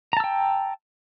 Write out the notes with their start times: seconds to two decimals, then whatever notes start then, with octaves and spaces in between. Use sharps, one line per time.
0.13 A#5
0.17 A5
0.20 E6
0.24 G5